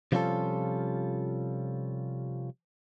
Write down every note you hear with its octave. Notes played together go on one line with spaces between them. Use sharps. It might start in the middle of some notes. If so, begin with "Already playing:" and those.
C3 F3 G3 C#4 F4 A4